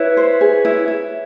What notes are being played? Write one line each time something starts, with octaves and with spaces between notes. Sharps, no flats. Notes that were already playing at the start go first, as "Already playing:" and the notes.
Already playing: E4 B4 C#5
C5
G#4
E4
E4